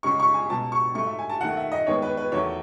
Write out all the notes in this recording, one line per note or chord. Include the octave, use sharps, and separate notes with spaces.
C#2 C#3 G#3 C#6
C#6
G#5
C#2 B2 F#3 A5
C#6
G#2 F#3 A3 C#6
E5
G#5
A5
D#2 D#3 A3 F#5
E5
D#5
D#2 D#3 G#3 B3 C#5
B4
B4
E2 D#3 F#3 A3 C#5